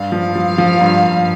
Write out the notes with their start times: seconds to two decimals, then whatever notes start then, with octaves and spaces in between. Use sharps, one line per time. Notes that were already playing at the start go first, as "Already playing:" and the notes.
Already playing: G2 F5
0.12 F3
0.36 F3
0.58 F3
0.81 G2
1.03 G2